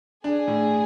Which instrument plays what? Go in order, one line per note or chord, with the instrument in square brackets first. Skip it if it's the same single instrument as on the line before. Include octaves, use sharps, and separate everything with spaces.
[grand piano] D4 [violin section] G#4
[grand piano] A2